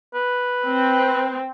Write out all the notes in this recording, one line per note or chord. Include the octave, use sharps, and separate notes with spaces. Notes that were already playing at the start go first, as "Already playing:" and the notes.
B4
C4